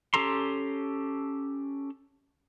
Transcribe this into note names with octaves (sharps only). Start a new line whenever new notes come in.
C#4 G4 A4 A#5 C6